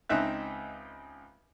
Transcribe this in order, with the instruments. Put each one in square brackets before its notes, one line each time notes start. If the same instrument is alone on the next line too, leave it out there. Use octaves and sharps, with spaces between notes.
[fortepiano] C#2 C4 D#4 E5 F#6